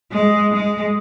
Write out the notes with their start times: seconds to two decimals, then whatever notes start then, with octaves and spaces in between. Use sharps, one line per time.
0.12 G#3
0.52 G#3